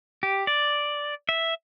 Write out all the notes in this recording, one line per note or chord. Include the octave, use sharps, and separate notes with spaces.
G4
D5
E5